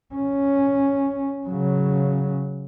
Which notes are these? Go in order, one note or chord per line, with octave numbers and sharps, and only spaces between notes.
C#4
C#3 F#3